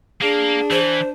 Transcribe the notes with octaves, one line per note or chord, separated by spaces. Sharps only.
A#3 D4 G#4
E3 C5